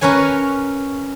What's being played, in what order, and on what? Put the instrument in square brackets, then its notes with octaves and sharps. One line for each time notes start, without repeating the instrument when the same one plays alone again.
[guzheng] C#4 A#4 B4 C#5 G#5